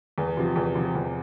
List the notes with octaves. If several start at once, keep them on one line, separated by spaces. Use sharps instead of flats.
E2
C3 F3
E2
C3 F3
E2